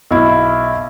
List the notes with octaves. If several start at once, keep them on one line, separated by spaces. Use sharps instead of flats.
B1 E4